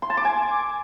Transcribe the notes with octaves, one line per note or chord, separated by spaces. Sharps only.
C6
A5
D6
G#5